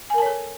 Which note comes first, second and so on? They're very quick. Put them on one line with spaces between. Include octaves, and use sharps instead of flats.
G#5 A#4 A5 C#5 A4